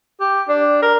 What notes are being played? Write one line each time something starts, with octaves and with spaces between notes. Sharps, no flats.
G4
D4
A#4